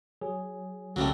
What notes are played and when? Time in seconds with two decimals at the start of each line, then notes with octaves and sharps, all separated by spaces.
0.21 F#3 G#4
0.96 C2 C#3 F#3 G3 A3